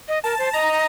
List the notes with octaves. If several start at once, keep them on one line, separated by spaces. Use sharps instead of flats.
D#5
A#4 A5
C5
D#5 A#5